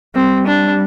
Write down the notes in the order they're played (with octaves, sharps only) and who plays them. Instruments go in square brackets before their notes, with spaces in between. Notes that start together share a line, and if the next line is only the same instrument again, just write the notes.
[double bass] G3 [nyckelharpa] C4
[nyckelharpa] D4